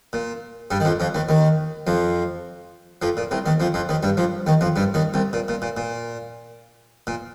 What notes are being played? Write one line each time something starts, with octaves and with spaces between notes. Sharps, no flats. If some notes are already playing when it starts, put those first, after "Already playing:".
A#2
G2 G3
D#3
F2 F3
F2 F3
D#2 D#3
D#2 D#3
F2 F3
F2 F3
A#2
C2 C3
D#2 D#3
F2 F3
F2 F3
D#2 D#3
G2 G3
F2 F3
D#2 D#3
F2 F3
G2 G3
D#2 D#3
C2 C3
A#2
A#2
A#2
A#2
A#2